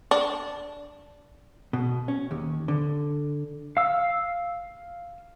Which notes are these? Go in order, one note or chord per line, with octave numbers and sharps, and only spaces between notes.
D4
B2
C#4
D#2
D3
F5 E6